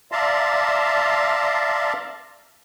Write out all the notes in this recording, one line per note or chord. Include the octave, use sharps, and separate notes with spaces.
D5 E5 F5 A5 A#5 C6